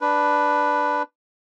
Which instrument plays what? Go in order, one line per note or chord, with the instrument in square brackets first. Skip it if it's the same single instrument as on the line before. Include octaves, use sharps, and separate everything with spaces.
[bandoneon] D4 B4